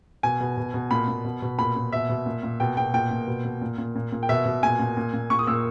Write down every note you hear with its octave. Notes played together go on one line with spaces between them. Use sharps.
B2 G#5
B2
B2
B2
A#2 B5
A#2
B2
B2
A#2 B5
A#2
B2 E5
B2
A#2
A#2
B2 G5
B2 G5
A#2 G5
A#2
B2
B2
A#2
A#2
A#2
A#2
G5
B2 E5
B2
A#2 G#5
A#2
A#2
A#2
A#2 C#6
D#6
A#2 E6